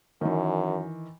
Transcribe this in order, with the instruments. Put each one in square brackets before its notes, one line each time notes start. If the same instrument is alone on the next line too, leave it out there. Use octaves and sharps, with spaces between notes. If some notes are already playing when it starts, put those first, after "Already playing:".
[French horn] F#2 [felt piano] D#3 E3